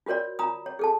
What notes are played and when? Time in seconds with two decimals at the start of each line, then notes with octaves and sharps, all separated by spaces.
0.06 F4 F#4 A#4 C#5 D5
0.39 F4 A#5 D#6
0.66 C#5
0.79 G#4 A4 A5